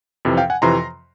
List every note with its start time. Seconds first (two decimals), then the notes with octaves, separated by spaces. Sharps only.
0.25 F2 C3 E3
0.37 F5 G5
0.50 F#5 G#5
0.62 F2 C3 E3 A#5 C6